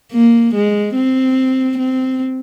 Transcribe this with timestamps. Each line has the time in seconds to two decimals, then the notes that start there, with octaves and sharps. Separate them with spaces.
0.12 A#3
0.55 G#3
0.95 C4
1.78 C4